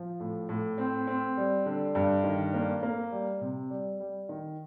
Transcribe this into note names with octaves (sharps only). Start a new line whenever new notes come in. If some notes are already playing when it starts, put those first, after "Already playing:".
Already playing: F3
A2
A2
C4
C4
G3
D3
G2
D#3
A#3
A#3
G3
C3
G3
G3
D#3